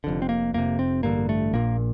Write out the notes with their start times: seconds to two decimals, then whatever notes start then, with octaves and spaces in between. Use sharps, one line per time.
0.04 F1 F2 D3
0.22 C4
0.29 A#3
0.54 F1 F2 C3 A#3
0.79 C4
1.03 A1 G2 D3 A#3
1.29 A3
1.54 A#1 A#2 A#3